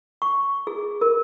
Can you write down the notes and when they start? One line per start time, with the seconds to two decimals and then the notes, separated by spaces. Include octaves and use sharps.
0.22 C#6
0.67 G#4
1.01 A#4